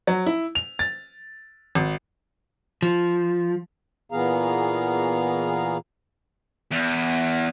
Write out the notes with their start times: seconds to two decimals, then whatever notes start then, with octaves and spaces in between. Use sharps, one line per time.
0.07 F#3
0.26 E4
0.55 F7
0.79 A6
1.75 G#1
2.82 F3
4.12 A#2 E3 B3 G#4 F5 A#5
6.71 E2